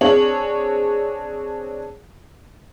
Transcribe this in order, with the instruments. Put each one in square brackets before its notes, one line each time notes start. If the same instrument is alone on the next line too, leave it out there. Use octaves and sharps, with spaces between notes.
[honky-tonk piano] C4 D4 G#4 C#5 F#7